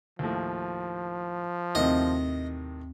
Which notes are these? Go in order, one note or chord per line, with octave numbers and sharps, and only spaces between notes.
D#2 A2 F3
D#2 A2 C3 D#3 C4 D#5